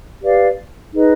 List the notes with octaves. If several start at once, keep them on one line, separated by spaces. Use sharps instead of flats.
G4 B4 D5 F5
D#4 G#4 B4 D#5